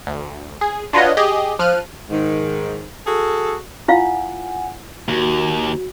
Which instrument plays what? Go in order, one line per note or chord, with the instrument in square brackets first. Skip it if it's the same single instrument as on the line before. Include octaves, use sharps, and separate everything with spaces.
[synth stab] D2
G#4
D4 F4 F#4 B4 C#5 D#5
G4 G#4 D#5
F3 F6 F#6 D#7
[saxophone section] G#2 D#3
F#4 G#4 A4
[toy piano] E4 F4 F5 [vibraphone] F#5 G#5
[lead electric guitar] D#2 [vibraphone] F#4